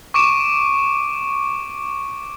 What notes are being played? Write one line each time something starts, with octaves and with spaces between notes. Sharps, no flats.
C#6 D6 D7 E7